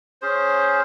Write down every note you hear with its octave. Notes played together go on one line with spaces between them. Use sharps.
C#4 G#4 C5